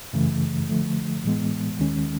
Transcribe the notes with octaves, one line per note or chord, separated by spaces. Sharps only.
F#2 C#3 E3 A3
D3 F3 A3
A2 E3 G#3 B3
D#2 D#3 G#3 C#4